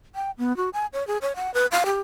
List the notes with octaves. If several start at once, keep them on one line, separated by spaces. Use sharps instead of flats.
G5
B3
F#4
G#5
C#5
G#4
C#5
F#5
B4
F5
G4